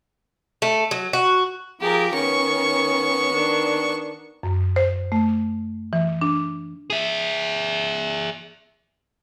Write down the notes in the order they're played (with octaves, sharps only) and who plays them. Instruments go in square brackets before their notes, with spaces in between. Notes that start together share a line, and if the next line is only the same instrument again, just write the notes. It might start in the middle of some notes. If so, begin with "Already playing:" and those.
[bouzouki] A3
F#3
F#4
[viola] F3 G#4 [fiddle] G4 A#4
[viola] D#3 C#4 [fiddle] B3 C#6
[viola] D#3 D4
[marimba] F#2
C5
A3
E3
D4
[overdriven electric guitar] G#4 E5